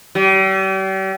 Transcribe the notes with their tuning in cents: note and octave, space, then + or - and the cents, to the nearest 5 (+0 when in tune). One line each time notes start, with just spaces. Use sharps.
G3 -40